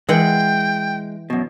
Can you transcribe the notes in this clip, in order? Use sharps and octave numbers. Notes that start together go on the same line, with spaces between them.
E3 G#3 F#5 G5
F#2 B2